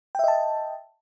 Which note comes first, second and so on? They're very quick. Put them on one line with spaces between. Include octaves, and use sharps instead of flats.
G5 E5 D#5 A5